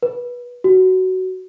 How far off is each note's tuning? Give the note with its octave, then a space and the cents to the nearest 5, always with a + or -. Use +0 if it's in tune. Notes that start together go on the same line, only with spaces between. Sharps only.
B4 -20
F#4 +15